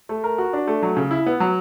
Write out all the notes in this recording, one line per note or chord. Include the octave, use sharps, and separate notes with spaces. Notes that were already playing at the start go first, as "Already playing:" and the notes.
A3
A#4
F#4
D4
A3
F#3
C#3
E4
B3
F#3